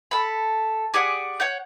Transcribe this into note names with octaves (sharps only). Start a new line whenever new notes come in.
A4 B5
G4 G#4 D5 F#5
C#5 F#5 G6